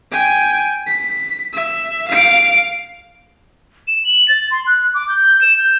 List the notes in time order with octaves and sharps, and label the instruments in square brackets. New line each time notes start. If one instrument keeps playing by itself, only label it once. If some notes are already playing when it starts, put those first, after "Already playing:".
[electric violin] G5 G#5
B6
E5
F5 D7
[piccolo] E7
F#7
A6
C6
F#6
D6
G6
E7
G6